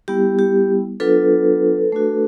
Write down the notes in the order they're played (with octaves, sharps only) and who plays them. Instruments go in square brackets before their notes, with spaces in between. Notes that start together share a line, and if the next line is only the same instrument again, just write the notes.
[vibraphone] G3 B3 E4 G4
G4
F#3 B3 D4 F4 A4 B4
A3 D4 F#4